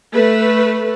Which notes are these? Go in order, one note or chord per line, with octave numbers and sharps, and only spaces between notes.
A3 B4